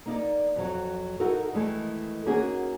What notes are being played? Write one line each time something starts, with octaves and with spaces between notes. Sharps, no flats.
A#3 D#4 D5
F2 F#3
D#4 E4 F#4 A4 A#4
D#3 E3 G#3 A3
A#3 C#4 D#4 F#4 G#4